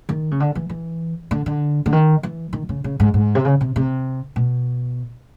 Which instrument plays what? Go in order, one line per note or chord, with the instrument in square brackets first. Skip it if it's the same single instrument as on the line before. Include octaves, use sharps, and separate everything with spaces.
[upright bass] D#3
C#3
D3
E3
E3
D3
D3
D3
D#3
E3
D#3
C#3
C#3
G#2
G#2
C3
C#3
C3
C3
B2